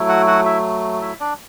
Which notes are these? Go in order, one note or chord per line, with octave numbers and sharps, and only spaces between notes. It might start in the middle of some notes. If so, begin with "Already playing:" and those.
Already playing: F#3 A3 E4
F#4 F#5
F#4 F#5
E4 E5
E4 E5
D4 D5